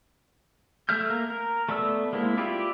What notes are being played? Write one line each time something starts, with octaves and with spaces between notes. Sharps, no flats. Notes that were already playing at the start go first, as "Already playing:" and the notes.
A3 E5 F6 G6
A#3 A#4
A#4
A3 B3 D5 E6
G#3 A#3 C4 E4
F4 G4 B4 D5 E5